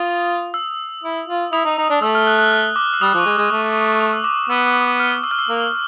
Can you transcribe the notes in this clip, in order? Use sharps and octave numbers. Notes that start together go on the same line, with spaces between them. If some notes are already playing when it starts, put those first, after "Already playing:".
Already playing: F4 D#6
E6
E4
F4
E4 D#6
D#4
D#4
D4
A3 E6
F6
F#6
F#6
F6
D6
E6
G3 D#6
F3
C#6
G#3 D6
G#3
A3 C#6
D#6
E6
D6
B3 E6
F6
E6
F6
E6
A#3